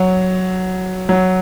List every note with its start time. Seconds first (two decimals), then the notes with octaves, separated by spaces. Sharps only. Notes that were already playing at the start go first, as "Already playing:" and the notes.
Already playing: F#3
1.09 F#3